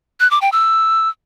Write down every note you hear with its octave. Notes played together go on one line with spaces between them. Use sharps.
F#6
D6
G5
E6